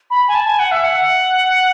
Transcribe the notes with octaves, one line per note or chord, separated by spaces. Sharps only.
B5
G#5
A5
G#5
F#5
E5
F#5